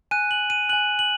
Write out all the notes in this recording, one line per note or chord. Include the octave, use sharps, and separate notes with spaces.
G#5 F#6 D#7
F#7
D#7
G#5 F#6 F#7
F#7